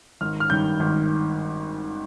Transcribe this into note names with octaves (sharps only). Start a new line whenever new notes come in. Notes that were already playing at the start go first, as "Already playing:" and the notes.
G#1 F6
F6
G2 D#3 G6
G#1